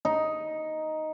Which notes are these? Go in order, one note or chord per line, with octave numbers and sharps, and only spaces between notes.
D#4